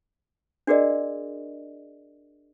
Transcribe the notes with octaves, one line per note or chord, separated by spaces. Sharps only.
D4 F#4 G#4 A#4 D5 D#5